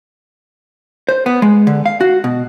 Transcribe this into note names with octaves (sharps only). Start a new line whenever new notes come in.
C5
B3
G#3
D3
F5
F#4
B2